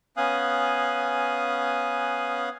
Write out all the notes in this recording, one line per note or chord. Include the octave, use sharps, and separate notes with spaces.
B3 C#4 F5 G#5 D#6 F#6